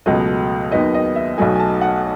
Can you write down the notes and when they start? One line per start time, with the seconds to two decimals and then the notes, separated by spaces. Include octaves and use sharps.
0.06 C#2 B2 F#3 A3 D#5
0.72 D#2 D#3 F#3 B3 D#5
0.94 D#5
1.16 E5
1.38 B1 B2 F#3 A3 G#5
1.56 G#5
1.60 A5
1.81 F#5